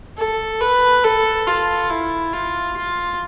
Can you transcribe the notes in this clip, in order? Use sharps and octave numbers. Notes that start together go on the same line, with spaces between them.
A4
B4
A4
F4
E4
F4
F4